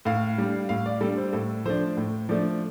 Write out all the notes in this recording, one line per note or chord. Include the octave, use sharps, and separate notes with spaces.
A2 F5
G3 D4
A2 F5
D5
G3 D4 A4
C5
A2 A4
F3 A3 D4 C5
A2
F3 A3 D4 D5